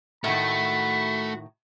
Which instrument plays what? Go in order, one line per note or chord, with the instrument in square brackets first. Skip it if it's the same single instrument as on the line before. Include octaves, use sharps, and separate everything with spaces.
[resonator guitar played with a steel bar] A2 D#3 [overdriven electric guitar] A3 [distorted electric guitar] F#4 [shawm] B5